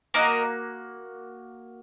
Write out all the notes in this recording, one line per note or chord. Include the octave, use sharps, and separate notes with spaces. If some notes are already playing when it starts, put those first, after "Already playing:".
A#3 D#4 F#4 A#4 D#5